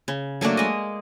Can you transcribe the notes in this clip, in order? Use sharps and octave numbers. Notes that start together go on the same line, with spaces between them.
C#3
F#3 A3 A#3 D4
G#3 D#5